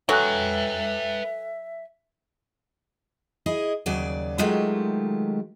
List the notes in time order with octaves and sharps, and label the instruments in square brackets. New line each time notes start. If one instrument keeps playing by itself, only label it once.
[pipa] F#3 [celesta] A4 G#5 F#6 [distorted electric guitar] B4 G5 [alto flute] E5
[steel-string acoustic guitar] E4 G#4 D#5
D#2 C#3 F#3 D5 G#5
D#3 F#3 G#3 A3 F4 G4